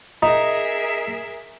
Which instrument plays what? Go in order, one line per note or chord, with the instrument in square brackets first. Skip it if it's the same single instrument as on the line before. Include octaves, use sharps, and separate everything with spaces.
[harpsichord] D#4 [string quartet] G#4 A#4 E5